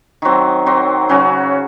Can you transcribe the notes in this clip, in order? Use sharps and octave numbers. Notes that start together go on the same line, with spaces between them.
D#3 F#3 C4
D#3 F#3 C4
C#3 F#3 C#4 F#4